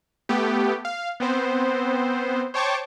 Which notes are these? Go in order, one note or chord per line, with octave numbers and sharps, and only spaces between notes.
A3 B3 G4
F5
B3 C4 C5
C5 C#5 G5 A5 C#6 D6